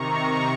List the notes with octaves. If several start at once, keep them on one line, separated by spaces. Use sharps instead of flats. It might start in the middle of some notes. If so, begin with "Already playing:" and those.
Already playing: C3 D#3 A#5 C#6